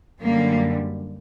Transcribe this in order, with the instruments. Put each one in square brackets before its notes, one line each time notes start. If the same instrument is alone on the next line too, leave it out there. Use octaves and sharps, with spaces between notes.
[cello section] F#2 D3 G3 A#3